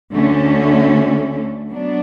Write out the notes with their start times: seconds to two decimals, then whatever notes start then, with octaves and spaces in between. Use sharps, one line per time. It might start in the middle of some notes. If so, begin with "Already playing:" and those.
0.14 D2 D3 A3 C#4
1.70 F#3 B3 D4